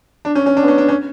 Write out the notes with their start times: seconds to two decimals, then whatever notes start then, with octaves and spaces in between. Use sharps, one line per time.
0.25 D4
0.35 C#4
0.46 C#4
0.57 D4
0.63 B3
0.68 C#4
0.78 D4
0.88 C#4